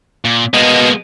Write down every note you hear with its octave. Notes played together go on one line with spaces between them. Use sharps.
A#2
G#3 A#3 B3 D#5